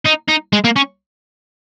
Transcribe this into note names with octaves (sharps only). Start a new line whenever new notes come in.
D#4
D#4
G#3
A#3
C#4